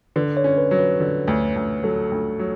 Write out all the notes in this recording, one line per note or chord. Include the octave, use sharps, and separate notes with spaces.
D3 B4
C#5
C#4
B4
F#3
B4
D3
D2
D2
F#3 A4
D2
F#3